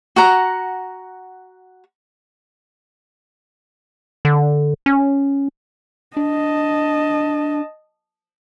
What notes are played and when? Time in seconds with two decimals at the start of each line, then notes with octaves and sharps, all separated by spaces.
0.16 F#4 F#5 A#5
4.25 D3
4.86 C#4
6.17 D4 D#5 A5